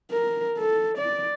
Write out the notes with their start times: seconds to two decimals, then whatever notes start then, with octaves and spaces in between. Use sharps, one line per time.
0.11 A#4
0.58 A4
0.98 D5